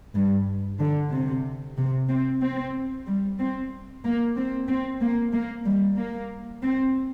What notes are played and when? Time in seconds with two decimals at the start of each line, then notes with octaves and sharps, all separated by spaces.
0.15 G2
0.79 D3
1.12 C3
1.77 C3
2.09 C4
2.41 C4
3.07 G3
3.39 C4
4.04 A#3
4.36 C4
4.69 C4
5.01 A#3
5.33 A#3
5.65 G3
5.98 A#3
6.63 C4